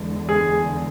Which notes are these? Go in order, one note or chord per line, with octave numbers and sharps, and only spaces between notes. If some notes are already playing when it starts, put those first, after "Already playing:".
Already playing: E2 D3 G#3
G#4